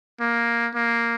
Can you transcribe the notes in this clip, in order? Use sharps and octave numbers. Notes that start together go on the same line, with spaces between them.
A#3
A#3